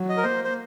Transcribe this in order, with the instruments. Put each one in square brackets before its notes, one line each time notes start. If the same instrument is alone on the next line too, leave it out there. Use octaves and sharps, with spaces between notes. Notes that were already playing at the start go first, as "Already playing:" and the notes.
Already playing: [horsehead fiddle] F#3
[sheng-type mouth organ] D#5
A#4
[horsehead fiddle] A#3 [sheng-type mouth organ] C5
[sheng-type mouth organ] C5